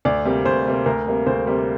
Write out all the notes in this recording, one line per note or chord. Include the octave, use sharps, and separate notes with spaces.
D2 D5
C3 G3 A#3
D2 C5
C3 G3 A#3
D2 A#4
C3 G3 A#3
D2 C5
C3 G3 A#3